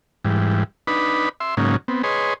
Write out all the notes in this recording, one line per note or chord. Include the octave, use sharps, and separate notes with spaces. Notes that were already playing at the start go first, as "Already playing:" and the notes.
G#2 E3 G3
D4 D#4 B4 B5
E5 C6
G#2 C#3 F#3 A#3 C#4 D#4
B3 C4
G#4 B4 C#5 D#5 C6